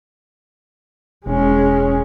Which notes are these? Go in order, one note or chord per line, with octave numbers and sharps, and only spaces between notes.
E1 G#3 C#4